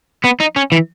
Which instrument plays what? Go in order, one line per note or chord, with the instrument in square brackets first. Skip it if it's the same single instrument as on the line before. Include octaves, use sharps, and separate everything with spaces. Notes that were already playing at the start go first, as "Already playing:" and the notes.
[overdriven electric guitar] B3
D#4
C#4
E3